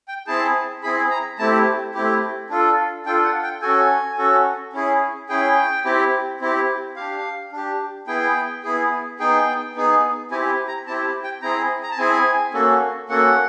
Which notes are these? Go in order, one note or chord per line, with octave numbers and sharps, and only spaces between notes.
G5
C4 E4 G#4 A5
C4 E4 G#4 B5
A#5
A3 C4 E4 G4 A5
A3 C4 E4 G4
D4 F4 A4
D4 F4 A4 G5
F#5
G5
C#4 F#4 A4 G#5
C#4 F#4 A4
C#4 E4 G#4
C#4 E4 G#4 G5
C4 E4 G4
C4 E4 G4
D4 G4 F5
D4 G4
B3 E4 G#4 G5
B3 E4 G#4
B3 D#4 G#4 G5
B3 D#4 G#4
C4 E4 G4 G#5
A#5
C4 E4 G4 A5
G5
C4 E4 G#4 A#5
A#5
A5
C4 E4 G#4 G#5
A#3 C#4 F#4 A4
A#3 C#4 F#4 A4 F#5